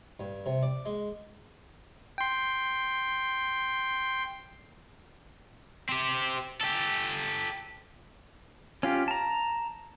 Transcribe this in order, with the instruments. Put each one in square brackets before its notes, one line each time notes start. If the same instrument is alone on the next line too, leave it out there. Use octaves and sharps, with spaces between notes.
[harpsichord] G2
C3
D5
G#3
[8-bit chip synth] G5 C6
[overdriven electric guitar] C4 G4
G4 A4
[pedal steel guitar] C#4 F4 G4
A5 A#5